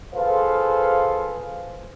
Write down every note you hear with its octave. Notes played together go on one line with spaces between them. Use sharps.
F4 G#4 A4 B4 C5 F5